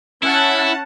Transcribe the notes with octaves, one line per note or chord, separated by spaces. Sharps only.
C#4 E4 F#5 A5